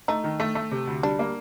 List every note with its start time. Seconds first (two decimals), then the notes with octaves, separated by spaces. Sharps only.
0.08 A3 D#4
0.24 D#3
0.40 A3
0.55 A3
0.71 C3
0.87 D2
1.03 G3 D4
1.19 A#3